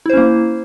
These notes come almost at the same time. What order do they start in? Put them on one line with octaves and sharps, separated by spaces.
E4 C5 C#4 A#3